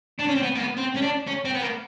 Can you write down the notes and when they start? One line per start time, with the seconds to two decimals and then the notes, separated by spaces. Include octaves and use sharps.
0.20 D4
0.28 C#4
0.36 C4
0.43 B3
0.55 A#3
0.60 B3
0.77 C4
0.95 C#4
1.02 D4
1.27 C#4
1.45 C4
1.55 B3
1.61 A#3